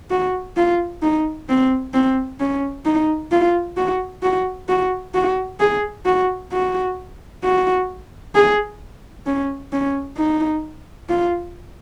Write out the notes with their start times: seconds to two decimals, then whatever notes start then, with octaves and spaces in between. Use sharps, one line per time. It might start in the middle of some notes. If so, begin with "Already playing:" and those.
0.10 F#4
0.57 F4
1.02 D#4
1.49 C4
1.94 C4
2.40 C#4
2.86 D#4
3.32 F4
3.77 F#4
4.23 F#4
4.69 F#4
5.14 F#4
5.60 G#4
6.06 F#4
6.52 F#4
7.44 F#4
8.35 G#4
9.26 C#4
9.72 C#4
10.18 D#4
11.09 F4